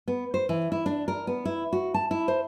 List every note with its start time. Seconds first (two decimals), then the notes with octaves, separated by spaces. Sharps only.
0.08 B3
0.34 C5
0.49 E3
0.72 E4
0.86 D4
1.08 A#4
1.27 B3
1.45 E4
1.73 F#4
1.94 A5
2.11 E4
2.28 C5